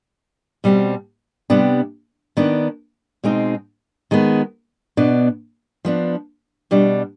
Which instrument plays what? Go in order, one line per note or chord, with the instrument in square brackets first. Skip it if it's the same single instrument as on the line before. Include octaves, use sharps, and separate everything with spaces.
[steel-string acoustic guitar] B2 G3 C4
C3 G3 B3 D4
D#3 B3 D4
B2 G#3 C4 D#4
D#3 G#3 B3
B2 B3 D4
F3 B3 D4
B2 G3 D4